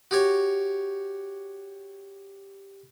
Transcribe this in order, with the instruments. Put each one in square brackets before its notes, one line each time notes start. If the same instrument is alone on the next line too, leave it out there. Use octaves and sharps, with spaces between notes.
[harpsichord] F#4 G4 C#5